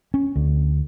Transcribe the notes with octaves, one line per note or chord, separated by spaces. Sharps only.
C#4
D2